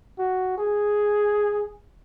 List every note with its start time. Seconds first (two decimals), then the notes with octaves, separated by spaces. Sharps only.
0.18 F#4
0.58 G#4